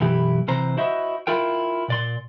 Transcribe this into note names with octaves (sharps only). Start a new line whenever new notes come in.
B1 F#2 E3 E4 G4
C3 E3 C5 A#5
E4 F#4 C5 D#5 E5
E4 F4 A#4 G5
A#2 D5 C6